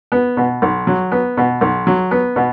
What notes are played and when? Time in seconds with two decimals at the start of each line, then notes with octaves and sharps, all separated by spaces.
0.12 B3
0.37 B2
0.62 B1
0.87 F#3
1.12 B3
1.37 B2
1.61 B1
1.87 F#3
2.11 B3
2.36 B2